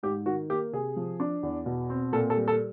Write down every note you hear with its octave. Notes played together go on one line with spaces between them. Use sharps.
G#2 G4
D#3 F#4
A#3 G4
C3 G#4
F3
D4
E2
B2
C4
A#2 A4
A4
G3
A4